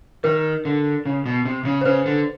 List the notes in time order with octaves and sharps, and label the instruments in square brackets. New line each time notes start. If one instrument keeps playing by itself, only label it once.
[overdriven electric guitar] D#3 [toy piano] A#4
[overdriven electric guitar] D3
C#3
B2
C3
C#3
[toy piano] C5
[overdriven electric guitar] C#3 [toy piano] B4
[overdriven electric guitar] D3